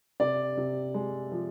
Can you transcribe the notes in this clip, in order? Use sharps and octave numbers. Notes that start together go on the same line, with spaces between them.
C3 D5
C3
G#3
F3